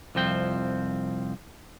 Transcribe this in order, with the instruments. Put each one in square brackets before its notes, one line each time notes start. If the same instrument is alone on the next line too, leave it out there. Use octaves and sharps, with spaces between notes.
[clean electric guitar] C2 F2 F3 C4 G5